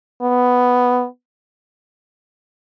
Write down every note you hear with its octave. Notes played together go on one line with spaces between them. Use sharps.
B3